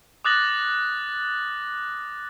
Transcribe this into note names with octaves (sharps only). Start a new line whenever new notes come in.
D6 D#6 F#6 A6 A#6 F#7